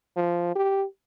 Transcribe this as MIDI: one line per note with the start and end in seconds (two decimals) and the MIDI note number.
0.17 0.54 53
0.56 0.85 67